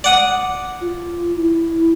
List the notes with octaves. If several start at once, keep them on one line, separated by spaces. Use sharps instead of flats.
D5 F#5 D#6
F4
E4